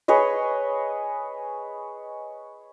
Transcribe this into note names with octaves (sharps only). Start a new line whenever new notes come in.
G#4 B4 C#5 D#5